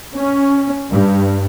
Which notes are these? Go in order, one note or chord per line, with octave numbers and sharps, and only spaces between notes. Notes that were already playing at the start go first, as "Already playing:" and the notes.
C#4
G2